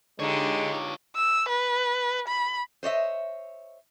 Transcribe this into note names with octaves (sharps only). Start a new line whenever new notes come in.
D3 G#3 D#4 F4 G4 C#5
E6
B4
B5
C5 C#5 D#5 E5